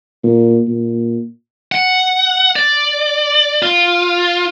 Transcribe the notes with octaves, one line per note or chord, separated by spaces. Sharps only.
A#2
A#2
F#5
D5
F4